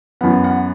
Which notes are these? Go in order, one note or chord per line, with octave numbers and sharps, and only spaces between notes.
F#2 E3 B3 F#5
F#5